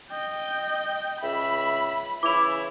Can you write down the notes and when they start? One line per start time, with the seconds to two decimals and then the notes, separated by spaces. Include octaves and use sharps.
0.10 D#5 G5
1.21 C#2 E5 B5
2.23 C#3 E3 E4 D6 F7